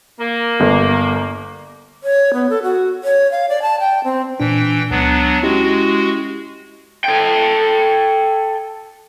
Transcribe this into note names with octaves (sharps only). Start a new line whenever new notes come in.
A#3
G1
C#5
B3
A4
F#4
C#5
F5
D5
A5
G5
C4
A#2 E3 D4 G5
C#2 F#3 B3 D4
G#3 C#4 E4 F#4 G4
A4 G5